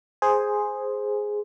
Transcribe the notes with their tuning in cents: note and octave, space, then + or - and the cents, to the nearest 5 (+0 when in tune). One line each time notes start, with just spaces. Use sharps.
G#4 +0 C5 +0